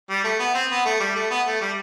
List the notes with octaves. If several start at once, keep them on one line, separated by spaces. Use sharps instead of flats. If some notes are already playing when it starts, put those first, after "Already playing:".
G3
A3
B3
C4
B3
A3
G3
A3
B3
A3
G3